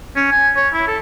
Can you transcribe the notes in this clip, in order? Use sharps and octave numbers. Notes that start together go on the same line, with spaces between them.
C#4
G#5
C#5
E4
A4